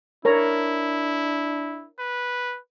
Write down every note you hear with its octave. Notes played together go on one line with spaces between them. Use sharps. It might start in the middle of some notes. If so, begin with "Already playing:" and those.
D4 E4 A#4 C#5 A#5
B4